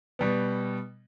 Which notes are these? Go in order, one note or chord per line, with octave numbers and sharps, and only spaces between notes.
B2 G3 B3